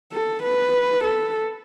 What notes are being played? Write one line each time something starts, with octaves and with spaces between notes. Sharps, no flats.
A4
B4
A4